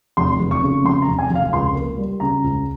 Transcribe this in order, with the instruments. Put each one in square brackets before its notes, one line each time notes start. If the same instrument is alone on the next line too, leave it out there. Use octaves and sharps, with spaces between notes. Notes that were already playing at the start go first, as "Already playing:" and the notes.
[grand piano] F1 C6
F1
C#6
C#3
F2 C6
A#5
F1
G#5
F1 F5
C#2 C6
A#3
G3
C#3 A#5
C#2